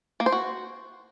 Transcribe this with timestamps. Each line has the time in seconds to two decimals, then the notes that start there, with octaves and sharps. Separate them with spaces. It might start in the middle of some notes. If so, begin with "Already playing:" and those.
0.20 A#3
0.26 C5
0.32 F#4